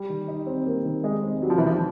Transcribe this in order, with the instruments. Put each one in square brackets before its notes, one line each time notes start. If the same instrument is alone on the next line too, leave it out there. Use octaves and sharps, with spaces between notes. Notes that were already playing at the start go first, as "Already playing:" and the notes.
Already playing: [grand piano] G3
D#3
D#4
C4
[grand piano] G3 [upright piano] A#3
[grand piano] D#3
[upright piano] G#3 [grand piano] D#4
[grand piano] C4
[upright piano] F#3 [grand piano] G3
[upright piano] F3
[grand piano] D#3 [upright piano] E3
[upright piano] F3